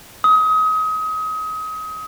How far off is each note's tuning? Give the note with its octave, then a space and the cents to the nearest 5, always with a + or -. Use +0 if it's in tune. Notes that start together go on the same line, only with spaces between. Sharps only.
D#6 +30